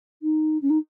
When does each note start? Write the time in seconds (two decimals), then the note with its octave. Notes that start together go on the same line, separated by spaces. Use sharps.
0.22 D#4
0.61 C#4
0.69 D#4